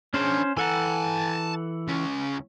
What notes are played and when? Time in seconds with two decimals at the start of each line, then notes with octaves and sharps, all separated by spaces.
0.14 C#4 D4 G#4 C5
0.57 E3 A4 F#5 G#5 A5
1.88 C#2 C#4